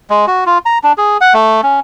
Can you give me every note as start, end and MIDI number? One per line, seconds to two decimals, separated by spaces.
0.10 0.26 56
0.27 0.44 66
0.46 0.58 65
0.66 0.78 82
0.83 0.92 62
0.98 1.17 68
1.21 1.33 78
1.34 1.61 57
1.63 1.80 61